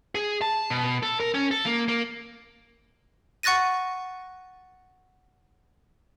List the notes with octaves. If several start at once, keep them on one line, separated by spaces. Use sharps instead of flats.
G#4
A5
B2
A4
A#4
C#4
A4
A#3
A#3
F#5 C#6 F#6 A6 A#6 D#7